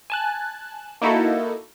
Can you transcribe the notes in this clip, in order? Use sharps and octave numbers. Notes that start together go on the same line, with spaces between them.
G#5 A5 F#6
A#3 D#4 E4 F#4 A4